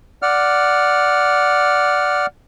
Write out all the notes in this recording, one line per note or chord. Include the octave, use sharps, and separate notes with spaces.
D5 F#5 F6